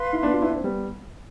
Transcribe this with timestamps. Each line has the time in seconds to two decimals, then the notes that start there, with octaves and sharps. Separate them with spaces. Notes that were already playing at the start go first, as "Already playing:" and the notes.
Already playing: B4 F5 C6
0.13 E4
0.23 B3 D4
0.33 F4
0.42 E4
0.48 D4
0.56 C4
0.64 G3 B3